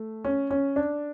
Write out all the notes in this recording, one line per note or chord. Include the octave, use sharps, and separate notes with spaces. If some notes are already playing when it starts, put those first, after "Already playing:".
Already playing: A3
C#4
C#4
D4